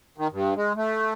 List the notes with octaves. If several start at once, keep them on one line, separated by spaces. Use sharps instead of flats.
D#3
G2
G#3
A3